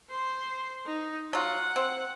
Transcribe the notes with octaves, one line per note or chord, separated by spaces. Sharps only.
C5 C6
D#4
F#3 F4 F#5
C4